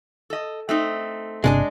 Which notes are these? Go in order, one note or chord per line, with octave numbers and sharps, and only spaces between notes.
A4 D#5
A3 C4 D#4
G1 C3 G#3 D4 G#4